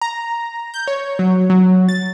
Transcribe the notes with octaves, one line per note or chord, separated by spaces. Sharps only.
A#5
G6
C#5
F#3
F#3
A6